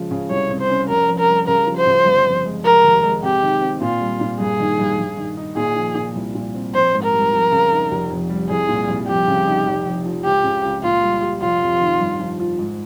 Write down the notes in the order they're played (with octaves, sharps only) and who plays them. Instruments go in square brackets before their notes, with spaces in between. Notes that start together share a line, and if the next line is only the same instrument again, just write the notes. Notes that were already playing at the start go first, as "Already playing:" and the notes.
Already playing: [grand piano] C#3 F3 G#3
C#3
[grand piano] C2 [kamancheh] C#5
[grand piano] C3
[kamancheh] C5
[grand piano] C#4
[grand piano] F1 [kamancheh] A#4
[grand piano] F2
[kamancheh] A#4
[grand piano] G3
[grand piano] C#3 [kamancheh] A#4
[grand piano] F3
[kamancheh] C5
[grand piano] C#3
G1
F2
G#3
[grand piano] F1 [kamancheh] A#4
[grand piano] D#2
G#3
[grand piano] C3 [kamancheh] G4
[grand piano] D#3
C4
[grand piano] A#2 [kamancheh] F4
[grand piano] G3
A#2
[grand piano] G2 [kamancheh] G#4
[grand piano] D#3
G2
G2
D#3
D#4
[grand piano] A#2 [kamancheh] G#4
[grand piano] F3
A#2
C2
A#2
C4
[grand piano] A#1 [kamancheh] C5
[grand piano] G#2
[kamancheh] A#4
[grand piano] G3
F2
C#3
D#4
F1
F2
G3
[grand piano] C2 [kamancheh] G#4
[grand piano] A#2
C2
[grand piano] F2 [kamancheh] G4
[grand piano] C#3
D#4
F1
F2
F3
[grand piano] C#2 [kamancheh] G4
[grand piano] C#3
C#2
[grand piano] A#2 [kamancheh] F4
[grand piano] G3
G4
[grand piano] F1 [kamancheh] F4
[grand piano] F2
D#3
G2
F3
F4
G#2